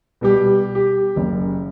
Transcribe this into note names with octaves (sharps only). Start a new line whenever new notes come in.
B2 G3 G4
G4
F#1